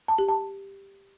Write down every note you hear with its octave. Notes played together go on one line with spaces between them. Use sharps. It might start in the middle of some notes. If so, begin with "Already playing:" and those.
A5
G4
A5